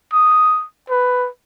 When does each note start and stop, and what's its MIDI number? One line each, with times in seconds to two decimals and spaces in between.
0.13 0.65 87
0.90 1.28 71